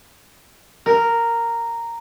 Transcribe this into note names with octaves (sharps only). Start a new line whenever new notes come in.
A#4